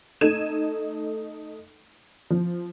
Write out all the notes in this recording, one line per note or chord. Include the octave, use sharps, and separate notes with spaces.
A3 D#4 A4 G#6 D#7 E7
F3